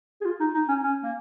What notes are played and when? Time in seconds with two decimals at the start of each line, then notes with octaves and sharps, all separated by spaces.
0.21 G#4
0.25 F4
0.40 D#4
0.55 D#4
0.68 C#4
0.83 C#4
1.04 A#3